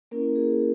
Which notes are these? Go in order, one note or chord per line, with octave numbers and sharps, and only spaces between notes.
A#3 C#4 E4 A#4
G#4